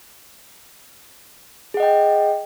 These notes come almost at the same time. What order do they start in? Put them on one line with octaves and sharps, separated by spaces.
G#4 F#5 D#5 G5